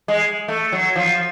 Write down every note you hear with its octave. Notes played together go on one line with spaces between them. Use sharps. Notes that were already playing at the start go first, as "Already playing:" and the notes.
G#3
A3
F#3
F3